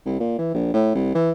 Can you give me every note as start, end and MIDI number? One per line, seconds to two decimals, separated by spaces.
0.06 0.17 36
0.20 0.36 46
0.39 0.52 52
0.54 0.71 34
0.74 0.94 45
0.95 1.11 36
1.15 1.31 52